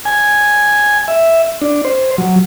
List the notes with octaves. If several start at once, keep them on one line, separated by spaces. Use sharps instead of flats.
G#5
E5
D4
C5
F#3